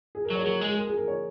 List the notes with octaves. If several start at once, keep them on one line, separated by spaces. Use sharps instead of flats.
G#4
A#4
F#3
C#5
G#4
F#3 A#4
G#3
G#4
A#4
G#4
A#4
C#5